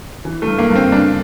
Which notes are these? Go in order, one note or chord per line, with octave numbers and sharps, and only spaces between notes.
E3
A3
G2
A#3
G2
C4
G2 D4